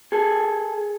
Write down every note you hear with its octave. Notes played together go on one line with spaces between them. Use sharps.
G#4 A4